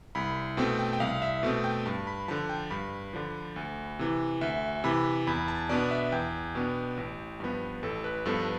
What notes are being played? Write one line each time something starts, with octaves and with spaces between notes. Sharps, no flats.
C2 B5
B2 A3 C4 G5
G5
G5
C2 F5
E5
B2 A3 C4
G5
G2 A5
B5
D3 F3 A5
G5
G2 B5
D3 F3
D2
C3 E3
D2 E5
C3 E3 B5
E2 B5
A5
B2 B3 D4 D5
E5
E2 G5
B2 B3 D4
A1
G2 F3 B3
A1 A4
B4
G2 F3 B3 A4